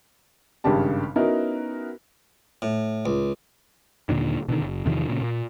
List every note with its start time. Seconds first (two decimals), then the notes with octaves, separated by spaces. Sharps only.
0.64 G#1 G2 C#3 C#4 G4 A5
1.16 B3 C#4 D#4 E4 F#4 A#4
2.62 A2
3.06 C#2
4.09 D#2 A#2 D3 D#3
4.48 B2 D3 D#3
4.61 F#1
4.86 E2 C3 D#3 F3
5.09 A#2 C#3
5.21 A#2